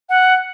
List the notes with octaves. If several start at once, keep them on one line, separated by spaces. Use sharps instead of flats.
F#5